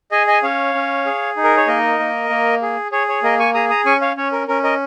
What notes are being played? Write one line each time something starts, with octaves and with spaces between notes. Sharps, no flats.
G#4 D#5 G#5
D#5 G#5
C#4 C#5 F5
C#4
G#4
D#4
A#4
C#5
A#3 A#4 D#5
A#3
A#3
G#4
G#4 C#5
C#5
A#3 A#4 D#5
G#5 C#6
G#4 A#5 D#6
A#5 D#6
C#4 G#5 C#6
C#5 F5
C#4 C#5
A#4
C#4 A#4
A#4 D#5